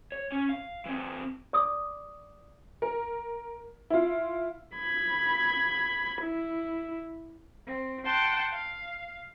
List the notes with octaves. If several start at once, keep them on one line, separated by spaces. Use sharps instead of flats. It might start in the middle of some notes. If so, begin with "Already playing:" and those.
C#5
C#4
F5
E3 C4
D5 D6 D#6
A#4
E4 F4
B5 G#6
E4
C4
F#5 G5 A5 C6
F5